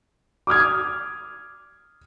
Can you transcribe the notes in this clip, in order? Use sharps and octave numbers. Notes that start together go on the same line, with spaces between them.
D6 D#6 F6 G#6